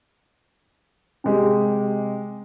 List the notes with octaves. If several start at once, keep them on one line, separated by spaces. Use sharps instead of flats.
C3 G#3 G4